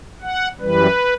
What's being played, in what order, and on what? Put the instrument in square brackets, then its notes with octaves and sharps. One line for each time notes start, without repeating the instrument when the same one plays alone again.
[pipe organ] F#5
F#2 E3 G3 B4